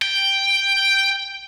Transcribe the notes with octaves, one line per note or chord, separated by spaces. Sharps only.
G5